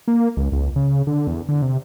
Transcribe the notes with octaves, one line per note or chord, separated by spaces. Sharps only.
A#3
C#2
C#2
C#3
D3
E2
D3
C3